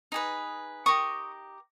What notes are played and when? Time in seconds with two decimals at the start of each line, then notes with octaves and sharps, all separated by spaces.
0.12 D#4 G#4 B4
0.86 D#4 G4 A#4 C#6 D#6